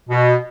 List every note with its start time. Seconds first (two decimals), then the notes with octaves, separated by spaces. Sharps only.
0.10 B2